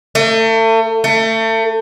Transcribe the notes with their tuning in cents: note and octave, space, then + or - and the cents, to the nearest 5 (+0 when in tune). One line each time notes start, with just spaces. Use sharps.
A3 +35
A3 +30